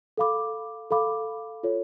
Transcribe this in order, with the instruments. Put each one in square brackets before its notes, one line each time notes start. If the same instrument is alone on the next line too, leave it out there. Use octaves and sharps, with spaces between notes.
[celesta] A4 F5 B5 D6
A4 F5 B5 D6
F4 A4 C#5